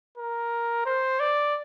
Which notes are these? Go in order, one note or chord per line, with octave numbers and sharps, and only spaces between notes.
A#4
C5
D5